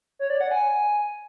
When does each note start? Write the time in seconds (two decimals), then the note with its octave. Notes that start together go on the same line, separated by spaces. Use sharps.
0.19 C#5
0.30 D5
0.40 F#5
0.51 G#5